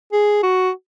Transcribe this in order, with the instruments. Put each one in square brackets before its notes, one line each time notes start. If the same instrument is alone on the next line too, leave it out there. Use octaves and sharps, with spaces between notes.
[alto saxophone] G#4
F#4